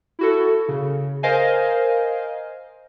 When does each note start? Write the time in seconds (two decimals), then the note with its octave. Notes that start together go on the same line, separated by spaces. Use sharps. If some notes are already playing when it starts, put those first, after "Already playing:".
0.19 E4 F#4 A4
0.68 C#3
1.23 A#4 C5 D#5 F5 G#5